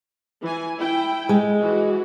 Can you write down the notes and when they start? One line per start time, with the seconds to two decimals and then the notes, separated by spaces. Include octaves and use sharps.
0.42 E3 G#5
0.78 E4 G5
1.29 G#3
1.60 E3 F#4